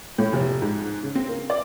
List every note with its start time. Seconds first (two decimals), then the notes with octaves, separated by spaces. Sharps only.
0.18 A2
0.33 F1
0.62 G#2
1.03 C#3
1.15 C4
1.29 A#3
1.50 D5